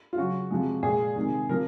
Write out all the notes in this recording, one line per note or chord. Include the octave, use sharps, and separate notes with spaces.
F4
C#3 F#3 F#4
C3 F3 G#3
A#2 G#3 G#4
C3 D#3 G#3
C3 F3 A#4